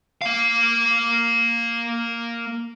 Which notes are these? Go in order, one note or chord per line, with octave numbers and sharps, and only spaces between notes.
A#3 F5